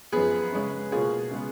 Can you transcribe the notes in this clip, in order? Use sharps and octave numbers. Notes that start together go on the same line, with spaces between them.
F#2 F3 B3 G#4 B4
C#3 G#3 C#4
B2 A#3 C#4 F4 G#4
C#3 G#3 B3